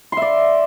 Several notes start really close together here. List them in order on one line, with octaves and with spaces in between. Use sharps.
C6 E5 D5